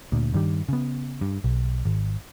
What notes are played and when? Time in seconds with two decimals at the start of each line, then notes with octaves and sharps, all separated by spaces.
0.12 D2 A#2
0.34 G2 D#3 G3
0.69 C#3 B3
1.21 G2
1.44 B1
1.85 G#1